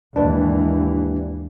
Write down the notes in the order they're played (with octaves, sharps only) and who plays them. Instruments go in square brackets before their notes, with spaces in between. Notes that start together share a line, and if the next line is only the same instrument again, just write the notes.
[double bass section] D#2 G#2 E3 [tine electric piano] D4 B4